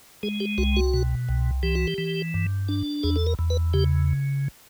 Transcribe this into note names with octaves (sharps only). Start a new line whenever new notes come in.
G#3 G#4
G4
C2 F#4
F#4
B2
C2
E3 G4
F#4
G4
E3
G2
D4
E2 G#4
A4
A#4
E2
B4
C#3 G4